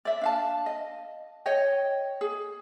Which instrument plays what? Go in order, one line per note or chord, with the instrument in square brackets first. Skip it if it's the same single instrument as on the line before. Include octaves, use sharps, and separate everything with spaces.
[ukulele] D5 E5
D4 F5 A5
D#5
C#5 D#5 G5
G#4